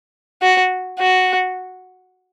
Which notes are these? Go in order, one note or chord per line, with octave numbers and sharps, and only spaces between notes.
F#4
F#4